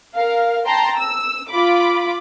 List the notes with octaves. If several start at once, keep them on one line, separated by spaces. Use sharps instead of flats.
A#4 F5
G5 A5 A#5 C6
E6
F4 B5 D6